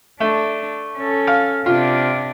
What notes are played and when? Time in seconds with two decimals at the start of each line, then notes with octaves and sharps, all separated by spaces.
0.20 A3 D4
0.98 C#4 A4
1.27 F5
1.66 C3 D4 F4